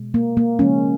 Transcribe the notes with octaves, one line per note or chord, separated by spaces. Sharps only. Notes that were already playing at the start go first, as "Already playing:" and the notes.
Already playing: B2 G#3
A#3
A#3
C#3 F3 G#3 C#4